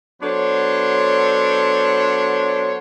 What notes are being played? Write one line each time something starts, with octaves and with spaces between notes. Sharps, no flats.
F#3 B3 D4 A4 C5 C#5